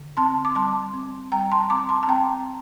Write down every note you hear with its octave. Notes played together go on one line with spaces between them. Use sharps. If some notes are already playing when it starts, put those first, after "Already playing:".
Already playing: D3
C4 A5 C6
D6
G3 A5 C6
C4
G3 G5 A#5
A5 C6
C4 A#5 D6
A5 C6
A5
C4 G5 A#5